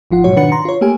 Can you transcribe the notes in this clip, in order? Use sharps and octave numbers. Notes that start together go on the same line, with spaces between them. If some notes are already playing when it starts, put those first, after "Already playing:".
G#1 F3 F4 F#5
G#2 B2 F#3 F#4 C#5
B2 D#3 D4 B4 F#5 C#7
A#5 C6
F4 C#5
A3 A#3 G4 G#5